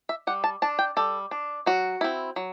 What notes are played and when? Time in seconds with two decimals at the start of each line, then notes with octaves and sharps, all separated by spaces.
0.09 E5
0.27 G3 F#5
0.44 A5
0.62 D4 A5
0.79 G5
0.97 G3 A4
1.31 D4
1.66 F#3 F#4
2.01 C4 E4
2.36 F#3